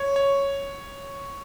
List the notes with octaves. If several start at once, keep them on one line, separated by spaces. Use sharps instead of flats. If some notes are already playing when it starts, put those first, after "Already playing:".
Already playing: C#5
C#5